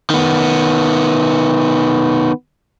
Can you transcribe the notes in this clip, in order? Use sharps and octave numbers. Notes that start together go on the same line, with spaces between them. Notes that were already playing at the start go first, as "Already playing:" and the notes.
D#3 B3